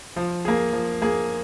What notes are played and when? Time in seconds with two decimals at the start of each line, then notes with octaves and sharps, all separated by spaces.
0.16 F3
0.45 A#3 G#4
0.73 F3
1.02 A#3 G#4